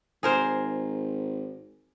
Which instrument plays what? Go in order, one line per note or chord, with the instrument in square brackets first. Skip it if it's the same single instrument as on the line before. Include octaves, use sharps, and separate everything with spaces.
[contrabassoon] G#1 [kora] G#4 A#4 C5